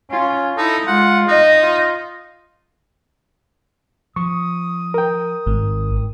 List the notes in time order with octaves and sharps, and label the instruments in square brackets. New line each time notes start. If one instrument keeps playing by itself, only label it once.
[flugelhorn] C#4 [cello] F4
[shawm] D#4 [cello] E4 [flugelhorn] A4
[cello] G#3 [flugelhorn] F4 [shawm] F#5
[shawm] D#4 [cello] D#5
[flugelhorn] F4
[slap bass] F3 [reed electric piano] C#6 [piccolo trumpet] D#6
[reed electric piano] A#4 G5
[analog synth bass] G#1 [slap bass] G#2